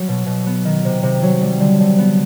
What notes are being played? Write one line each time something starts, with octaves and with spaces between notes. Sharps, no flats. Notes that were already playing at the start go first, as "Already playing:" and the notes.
Already playing: F#3
B2
B2
B3
D#3
C3
C3
F#3
G3
D3
D3
B3